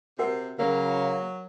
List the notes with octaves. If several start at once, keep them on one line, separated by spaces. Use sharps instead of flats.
C3 F#4 A#4 F#5
C#3 F#3 A#3 A#4